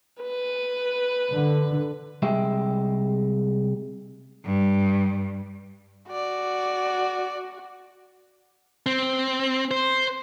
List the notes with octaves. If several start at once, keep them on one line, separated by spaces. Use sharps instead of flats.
B4
D3
C2 G#3 G4 E5
G2
F#4 D5
C4
C5